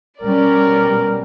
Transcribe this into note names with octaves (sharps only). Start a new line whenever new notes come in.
B2 G3 C#4 A#4 D5